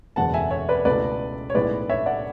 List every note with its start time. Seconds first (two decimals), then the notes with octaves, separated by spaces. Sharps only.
0.16 F#1 E2 B2 G#3 F#5 A5
0.34 E5 G#5
0.51 C#5 E5
0.69 B4 D5
0.85 C#2 B2 A3 E4 B4 D5
1.50 C#5
1.54 B1 A2 G#3 B3 E4 B4 D5
1.89 C#5 E5
2.06 D5 F#5